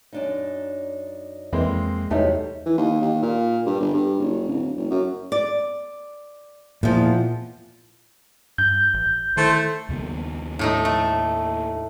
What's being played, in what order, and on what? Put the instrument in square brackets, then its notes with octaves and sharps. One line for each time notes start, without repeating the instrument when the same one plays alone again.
[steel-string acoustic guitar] F#2 D4 D#4
[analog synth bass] F2 [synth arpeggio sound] E3 [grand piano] G#3 A#3 C4
[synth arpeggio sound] E2 A3 D#4 [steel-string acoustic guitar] C3 F#3 G3
[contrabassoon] E3
D#2
D#2
A#2
G2
G1
G2
F#1
D1
F#1
F#2
[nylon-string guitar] D5
[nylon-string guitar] E2 F3 [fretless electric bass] A#2
[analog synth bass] G2 [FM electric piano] G6
[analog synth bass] A1
[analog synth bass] D#3 [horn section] A3 E4 C5
[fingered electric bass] D#2 C#3 B3
[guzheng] A2 A3 D#4
A3